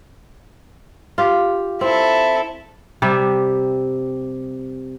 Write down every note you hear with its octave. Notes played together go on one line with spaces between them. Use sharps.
F4 G4
C4 E4 A4
C3 G3 E5